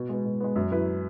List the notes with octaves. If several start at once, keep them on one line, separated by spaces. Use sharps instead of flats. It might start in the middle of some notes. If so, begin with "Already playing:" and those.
Already playing: B2
G#3 B3
B2
G#3 B3
F#2
F#3 E4 B4